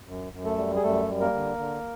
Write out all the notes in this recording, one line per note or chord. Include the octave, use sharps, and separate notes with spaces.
F#2
F#2
A3 A4
G3
G#4
F#2 A3 A4
G3
A#3 A#4
D3
D3